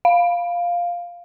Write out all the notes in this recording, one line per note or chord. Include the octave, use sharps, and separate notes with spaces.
F5